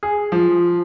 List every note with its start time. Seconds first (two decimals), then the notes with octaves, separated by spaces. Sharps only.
0.03 G#4
0.32 F3